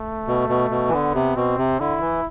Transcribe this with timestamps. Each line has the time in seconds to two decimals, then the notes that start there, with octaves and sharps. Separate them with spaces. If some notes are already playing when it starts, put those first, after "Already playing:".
Already playing: A3
0.28 B2
0.49 B2
0.70 B2
0.89 E3
0.92 D3 B3
1.14 C3
1.36 B2 C4
1.58 C3
1.80 D3 E4
2.01 E3